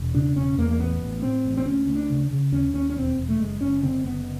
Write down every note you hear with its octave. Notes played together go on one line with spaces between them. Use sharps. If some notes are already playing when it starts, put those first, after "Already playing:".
Already playing: E1
C#3 D4
E1 C#4
E2 A#3
A#3
A1 B3
A1
A2 C4
A1
C4
D2 C#4
D2
D4
C#3
C#3
D#2 C#4
D#2 C#4
C#4
E1 C4
E1
A3
F#1 G#3
F#1 C#4
D3 C4
F#1 B3